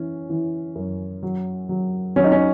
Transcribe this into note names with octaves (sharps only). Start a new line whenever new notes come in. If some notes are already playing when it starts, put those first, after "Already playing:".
Already playing: E3 C#4
E3
F#2
F#3
F#3
F#3 C#4
D#4
C#4